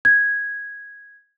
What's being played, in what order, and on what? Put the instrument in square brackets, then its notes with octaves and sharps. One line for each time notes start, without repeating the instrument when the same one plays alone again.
[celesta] G#6